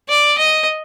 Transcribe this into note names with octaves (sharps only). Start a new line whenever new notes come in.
D5
D#5